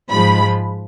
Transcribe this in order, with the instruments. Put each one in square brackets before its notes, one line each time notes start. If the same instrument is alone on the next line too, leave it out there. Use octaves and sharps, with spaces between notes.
[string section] G#2 F3 G#3 B5